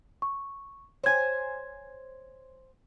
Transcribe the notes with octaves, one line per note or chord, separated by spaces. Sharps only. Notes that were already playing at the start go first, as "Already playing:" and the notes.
C#6
C5 C#5 G#5 G#6